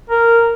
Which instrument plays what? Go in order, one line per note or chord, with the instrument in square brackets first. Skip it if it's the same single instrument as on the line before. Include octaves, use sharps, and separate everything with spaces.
[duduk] A#4